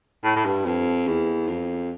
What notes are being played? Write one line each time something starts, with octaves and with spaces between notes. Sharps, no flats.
A2
A2
G2
F2
E2
F2